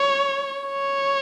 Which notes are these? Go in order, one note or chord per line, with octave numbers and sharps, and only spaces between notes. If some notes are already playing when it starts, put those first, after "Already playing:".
Already playing: C#5
C#5